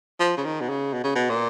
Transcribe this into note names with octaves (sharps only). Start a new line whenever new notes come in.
F3
C#3
D#3
B2
C#3
B2
C#3
B2
A#2